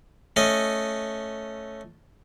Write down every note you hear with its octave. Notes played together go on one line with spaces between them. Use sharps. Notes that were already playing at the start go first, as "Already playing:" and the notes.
A3 C#4 D#5